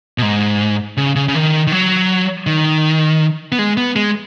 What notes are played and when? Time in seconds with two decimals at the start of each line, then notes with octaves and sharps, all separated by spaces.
0.18 B2
0.22 G#2
0.97 C#3
1.16 C#3
1.28 C#3
1.35 D#3
1.67 D#3
1.72 F#3
2.47 D#3
3.52 B3
3.59 G#3
3.77 B3
3.96 G#3